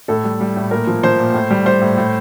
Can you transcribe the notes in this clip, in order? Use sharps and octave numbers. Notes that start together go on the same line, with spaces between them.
A2 A4
G3
G3
A2
A#2 A#4
F3
F3 C5
A#2
A2
G3
G3 C5
A2
A2